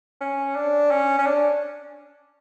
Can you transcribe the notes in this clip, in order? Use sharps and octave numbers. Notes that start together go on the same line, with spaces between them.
C#4
D4
C#4
C#4
D4